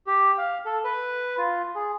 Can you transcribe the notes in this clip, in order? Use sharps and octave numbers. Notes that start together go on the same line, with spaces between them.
G4
F5
A4
B4
F4
G#4